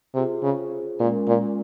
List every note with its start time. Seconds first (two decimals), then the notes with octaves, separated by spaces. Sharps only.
0.14 C3 F4 G#4 C5
0.43 C#3
0.99 A#2 G#3 C#4 F4 A#4
1.27 A#2